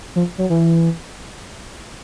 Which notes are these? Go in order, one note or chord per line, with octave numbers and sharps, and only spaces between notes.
F3
F#3
E3